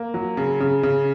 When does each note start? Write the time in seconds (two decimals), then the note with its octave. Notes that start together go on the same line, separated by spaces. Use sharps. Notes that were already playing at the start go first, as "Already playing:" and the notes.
Already playing: A#3
0.14 F#3
0.37 C#3
0.60 C#3
0.83 C#3